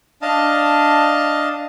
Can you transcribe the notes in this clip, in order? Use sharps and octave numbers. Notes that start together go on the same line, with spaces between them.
D4 D#5 F5 A5